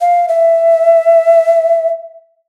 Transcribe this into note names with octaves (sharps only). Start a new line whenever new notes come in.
F5
E5